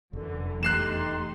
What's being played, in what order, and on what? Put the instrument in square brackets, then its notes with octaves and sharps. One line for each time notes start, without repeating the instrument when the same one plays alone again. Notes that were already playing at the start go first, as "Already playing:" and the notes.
[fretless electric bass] F1 [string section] F#2 D3 E3
[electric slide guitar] E2 A3 [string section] D#4 G4 C6 [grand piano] F#6 C7 E7